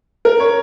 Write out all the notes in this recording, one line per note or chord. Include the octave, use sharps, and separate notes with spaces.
A#4
C#5